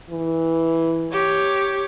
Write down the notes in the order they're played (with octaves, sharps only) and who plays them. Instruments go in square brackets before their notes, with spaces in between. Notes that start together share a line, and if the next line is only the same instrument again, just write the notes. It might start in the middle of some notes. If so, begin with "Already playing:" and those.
[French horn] E3
[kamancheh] G4 C#5